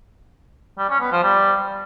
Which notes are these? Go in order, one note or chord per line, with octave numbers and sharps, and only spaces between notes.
G3
C#4
B3
F3
G3